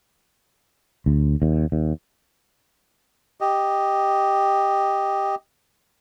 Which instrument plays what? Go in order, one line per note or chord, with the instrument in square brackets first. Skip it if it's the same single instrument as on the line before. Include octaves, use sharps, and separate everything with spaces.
[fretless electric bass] D2
D#2
D#2
[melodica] G4 D#5